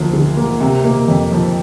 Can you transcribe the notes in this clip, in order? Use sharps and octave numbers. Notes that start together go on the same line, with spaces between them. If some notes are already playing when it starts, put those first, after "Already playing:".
Already playing: D2 F3 A#3
D3
A#3
C3
A#3
F2
F3